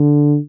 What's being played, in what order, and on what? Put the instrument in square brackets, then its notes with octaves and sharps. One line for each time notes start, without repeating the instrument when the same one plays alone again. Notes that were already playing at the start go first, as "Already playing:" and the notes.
Already playing: [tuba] D3